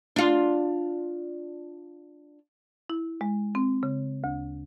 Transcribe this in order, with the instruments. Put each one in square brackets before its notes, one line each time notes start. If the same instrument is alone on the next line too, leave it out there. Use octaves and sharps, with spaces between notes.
[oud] D4 F4
[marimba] E4
G#3
C4
C#3
D2